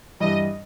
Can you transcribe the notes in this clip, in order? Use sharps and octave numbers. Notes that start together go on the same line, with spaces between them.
G2 E3 G3 D#5